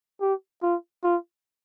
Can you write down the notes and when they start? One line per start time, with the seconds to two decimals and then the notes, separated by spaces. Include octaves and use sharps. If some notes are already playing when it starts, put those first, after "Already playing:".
0.21 G4
0.63 F4
1.04 F4